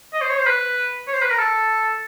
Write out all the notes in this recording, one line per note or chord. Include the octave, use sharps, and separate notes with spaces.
D#5
C5
C#5
C5
B4
C#5
C5
B4
A#4
A4